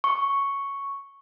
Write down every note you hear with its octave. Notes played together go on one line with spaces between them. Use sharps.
C#6